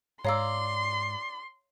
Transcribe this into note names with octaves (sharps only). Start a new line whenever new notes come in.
G#2 C#5 D5 F5 A#5 C6 E6